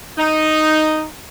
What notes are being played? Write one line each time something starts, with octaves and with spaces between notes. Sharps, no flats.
D#4